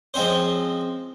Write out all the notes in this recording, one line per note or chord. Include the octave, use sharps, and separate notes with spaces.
F3 G#3 C4 C#4 C5